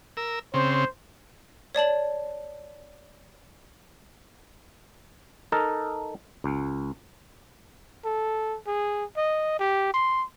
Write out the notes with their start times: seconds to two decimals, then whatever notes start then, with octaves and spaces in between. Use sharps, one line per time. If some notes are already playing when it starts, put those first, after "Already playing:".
0.17 A#4 E6
0.54 C#3 C4 C5
1.75 C#5 D5 A5 F#7
5.52 D#4 A4 A#4
6.44 C#2
8.05 A4
8.67 G#4
9.17 D#5
9.60 G4
9.94 C6